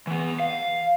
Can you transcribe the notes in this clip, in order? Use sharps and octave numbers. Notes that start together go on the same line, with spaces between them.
E3 B3
F5